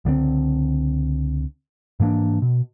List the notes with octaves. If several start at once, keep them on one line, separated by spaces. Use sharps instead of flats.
C#2 D3 F3 C4
G#2 E3 A#3 D4
B2